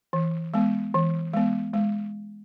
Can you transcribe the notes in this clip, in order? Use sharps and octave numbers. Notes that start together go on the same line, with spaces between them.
E3
G#3 B3
E3
G#3 B3
G#3